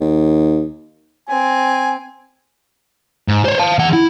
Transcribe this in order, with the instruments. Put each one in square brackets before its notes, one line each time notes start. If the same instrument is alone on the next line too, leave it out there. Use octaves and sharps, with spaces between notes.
[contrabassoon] D#2
[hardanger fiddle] C4 [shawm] G#5
[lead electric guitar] G#2
C5 C#5
F5 A5
E3 F#5
E4